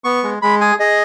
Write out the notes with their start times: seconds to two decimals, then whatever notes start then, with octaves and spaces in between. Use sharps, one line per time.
0.04 B3 C#6
0.23 G#3
0.42 G#3 B5
0.61 G#4 G#5
0.80 G#4 D#5